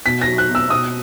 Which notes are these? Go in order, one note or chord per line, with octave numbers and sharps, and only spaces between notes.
B2 B6
A#6
F#3
F#6
B2
E6
B2 D#6